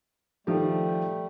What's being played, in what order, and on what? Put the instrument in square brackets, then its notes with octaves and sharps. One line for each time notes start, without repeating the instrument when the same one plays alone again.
[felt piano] D#3 F3 G4 [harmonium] G3 A3